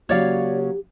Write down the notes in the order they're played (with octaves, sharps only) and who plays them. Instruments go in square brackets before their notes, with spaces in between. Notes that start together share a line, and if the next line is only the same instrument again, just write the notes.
[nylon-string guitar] C#3 F#3 A#3 [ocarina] G4 [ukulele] C#5 D5 F5